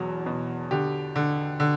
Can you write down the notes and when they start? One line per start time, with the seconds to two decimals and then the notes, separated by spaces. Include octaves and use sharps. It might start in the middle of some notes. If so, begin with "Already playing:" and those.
Already playing: E2 B2 F#3
0.26 B2
0.71 D3 G4
1.16 D3
1.60 D3